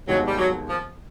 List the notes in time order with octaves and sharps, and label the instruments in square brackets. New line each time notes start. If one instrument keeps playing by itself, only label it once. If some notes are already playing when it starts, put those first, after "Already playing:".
[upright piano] F1 D#2 D#3 G#3 B3 [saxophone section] F#3
[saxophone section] G3
F#3
F3